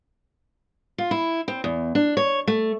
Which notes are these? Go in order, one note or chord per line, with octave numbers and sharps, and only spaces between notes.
F4
E4
C4
E2
D4
C#5
A3